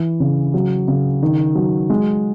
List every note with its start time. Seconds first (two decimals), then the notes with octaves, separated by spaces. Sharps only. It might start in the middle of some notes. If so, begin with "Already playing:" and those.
Already playing: E3
0.20 C#3
0.54 F#3
0.88 C#3
1.23 D#3
1.55 F#3
1.90 G#3